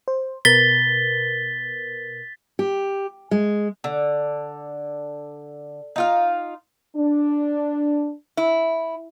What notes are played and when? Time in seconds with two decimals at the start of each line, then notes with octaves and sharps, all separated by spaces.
0.08 C5
0.45 B2 A#4 B4 A6 B6 G7
2.59 G4
3.31 G#3
3.84 D3
5.96 D#4 F4 F5
6.96 D4
8.37 E4